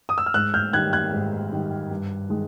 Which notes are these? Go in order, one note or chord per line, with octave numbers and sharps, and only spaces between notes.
D#6
E6
F6
G#2 E6 F#6
F6 G6
D#3 G3 F#6 G#6
F#6 G#6
G#2
D#3 G3
G2
D#3 G#3